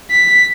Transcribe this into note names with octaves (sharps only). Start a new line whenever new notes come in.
B6